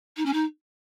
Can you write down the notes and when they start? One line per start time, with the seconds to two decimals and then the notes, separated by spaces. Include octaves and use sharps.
0.16 D#4
0.25 C#4
0.33 D#4